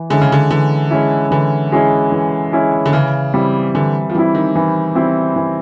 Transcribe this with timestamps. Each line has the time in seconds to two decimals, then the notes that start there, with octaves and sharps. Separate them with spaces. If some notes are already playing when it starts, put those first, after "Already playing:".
Already playing: E3
0.10 D3 G#3 C#4 E4
0.21 C#3
0.32 D3
0.50 D3 E3
0.91 G#3 C#4 E4
1.31 D3 E3
1.72 G#3 C#4 E4
2.12 E3
2.53 G#3 C#4 E4
2.86 D3
2.93 C#3 E3
3.34 G3 C4 E4
3.75 D3 E3
4.10 F3
4.14 E3 G3 C4 E4
4.35 D#3
4.55 E3
4.95 G3 C4 E4
5.36 E3